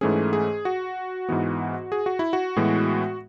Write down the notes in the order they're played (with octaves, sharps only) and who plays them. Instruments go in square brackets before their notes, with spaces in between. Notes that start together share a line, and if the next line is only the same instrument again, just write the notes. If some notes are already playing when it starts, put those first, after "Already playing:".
[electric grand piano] G#2 E3 A3 C#4 G#4
G#4
F#4
G#2 E3 B3
G#4
F#4
E4
F#4
A2 E3 G#3 B3